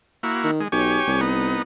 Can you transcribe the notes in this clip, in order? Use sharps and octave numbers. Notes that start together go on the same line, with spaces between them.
A#3 E4 F#4
D#3
G#3
B1 G4 C#5 G#5
C2
B3 D#4